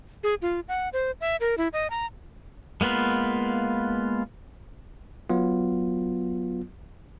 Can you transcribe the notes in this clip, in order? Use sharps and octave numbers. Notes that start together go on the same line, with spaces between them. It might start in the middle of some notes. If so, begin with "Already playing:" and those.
G#4
F4
F#5
C5
E5
A#4
E4
D#5
A#5
G#3 A#3 B3 F4 B4
F#3 B3 F4